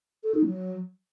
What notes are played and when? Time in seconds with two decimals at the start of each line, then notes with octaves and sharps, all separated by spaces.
0.23 A4
0.34 D#4
0.45 F#3